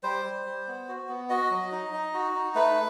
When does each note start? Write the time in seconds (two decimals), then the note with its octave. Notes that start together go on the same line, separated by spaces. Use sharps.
0.03 G3 C5
0.25 G3
0.46 G3
0.67 B3
0.88 F#4
1.09 B3
1.29 F#4 D#5
1.50 F#3
1.72 D#4
1.93 D#4
2.14 F#4
2.35 D#4
2.55 A3 B4